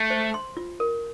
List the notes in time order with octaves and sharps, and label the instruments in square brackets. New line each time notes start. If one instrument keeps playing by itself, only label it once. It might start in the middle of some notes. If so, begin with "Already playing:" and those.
Already playing: [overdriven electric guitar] A3
[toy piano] C5
C6
F4
A#4